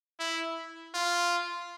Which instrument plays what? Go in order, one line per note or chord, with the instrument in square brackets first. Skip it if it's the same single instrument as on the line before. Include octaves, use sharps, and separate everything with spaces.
[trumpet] E4
F4